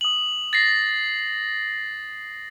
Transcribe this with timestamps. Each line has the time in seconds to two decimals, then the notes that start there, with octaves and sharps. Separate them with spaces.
0.01 D#6 F#7
0.53 A6 A#6 C7